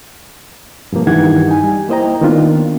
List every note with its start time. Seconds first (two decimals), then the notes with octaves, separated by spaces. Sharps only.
0.93 G2 B2 F3 A#3
1.07 G2 D#3 E3 D#4 F#5 G#6
1.48 D#4 G#5
1.64 G3
1.88 A#3 E4 C5 D#5 G5 A#5
2.22 D#3 A#3 B3 D4 F4